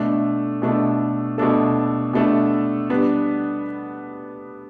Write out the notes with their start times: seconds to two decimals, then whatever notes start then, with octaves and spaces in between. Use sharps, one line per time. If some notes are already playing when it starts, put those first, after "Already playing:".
Already playing: B2 A3 D4 A4
0.62 B2 A3 D4 A4
1.38 B2 A3 D4 A4
2.13 B2 A3 D4 A4
2.90 G3 B3 D4